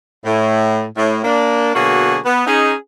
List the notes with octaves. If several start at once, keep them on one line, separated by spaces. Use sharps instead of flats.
A2
A2
A#3 D4
B2 D3 F#3 A#3 F#4 G#4
B3
C#4 D#4 G#4